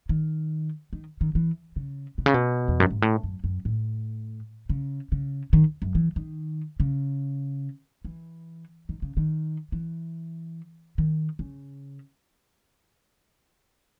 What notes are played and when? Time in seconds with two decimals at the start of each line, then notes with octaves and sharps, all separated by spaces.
0.09 D#3
0.93 D#3
1.21 D#3
1.35 E3
1.76 C#3
2.18 B2
2.26 C#3
2.34 B2
2.68 E2
2.80 F#2
2.90 G#2
3.02 A2
3.23 F#2
3.44 F#2
3.65 A2
4.69 C#3
5.12 C#3
5.53 D#3
5.82 F#2
5.95 E3
6.16 D#3
6.80 C#3
8.05 E3
8.89 D#3
9.02 C#3
9.17 D#3
9.72 E3
10.98 D#3
11.39 C#3